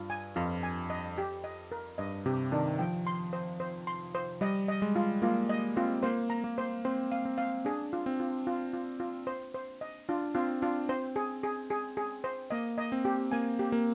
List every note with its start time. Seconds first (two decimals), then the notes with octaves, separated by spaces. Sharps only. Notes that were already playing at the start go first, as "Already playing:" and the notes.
Already playing: G2 F4
0.10 G#5
0.36 F2 F4
0.63 G#5
0.90 D#5
1.18 G4
1.44 D#5
1.72 A#4
1.98 G2 D#5
2.26 C3 G4
2.52 D#3 D4
2.79 F3 G5
3.07 C6
3.33 C5
3.60 C5
3.87 C6
4.15 C5
4.41 G3 D#5
4.68 D#5
4.82 G#3
4.95 F4
5.22 A#3 F4
5.49 D#5
5.77 C4 F4
6.03 A#3 C5
6.30 A#5
6.44 A#3
6.58 C5
6.85 C4 C5
7.12 F5
7.25 C4
7.38 F5
7.65 D4 G#4
7.93 F4
8.06 C4
8.20 F4
8.47 F4
8.73 F4
9.00 F4
9.27 C5
9.54 C5
9.81 D#5
10.09 D4 F4
10.35 C4 F4
10.62 D4 F4
10.89 C4 C5
11.16 G#4
11.43 G#4
11.70 G#4
11.97 G#4
12.24 C5
12.50 A#3 D#5
12.78 D#5
12.92 C4
13.05 G4
13.31 A#3 G#5
13.59 G4
13.72 A#3